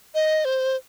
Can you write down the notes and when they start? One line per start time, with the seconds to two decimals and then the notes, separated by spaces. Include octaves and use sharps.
0.15 D#5
0.45 C5